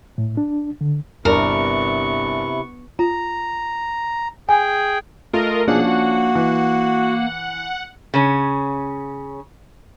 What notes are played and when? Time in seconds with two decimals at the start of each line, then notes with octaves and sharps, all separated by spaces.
0.18 A2
0.37 D4
0.81 D3
1.25 G1 C3 B3 D4 E4 A#4 C#6
2.99 F4 A#5
4.49 G#4 G5 G#5
5.33 A3 F4 A#4 D#5
5.68 B2 F3 A#3 C#4 D4 G#4 F#5
5.84 F#4
6.35 E3
8.14 C#3 C#4